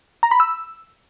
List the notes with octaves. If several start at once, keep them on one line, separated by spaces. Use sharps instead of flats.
A#5
B5
E6